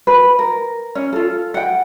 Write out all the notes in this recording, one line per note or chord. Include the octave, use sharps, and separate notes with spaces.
B4
A#4
C#4
F4 A4
F#5 G5